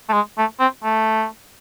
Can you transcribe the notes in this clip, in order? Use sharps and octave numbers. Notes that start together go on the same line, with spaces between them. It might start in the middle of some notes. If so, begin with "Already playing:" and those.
A3
G#3
A3
C4
A3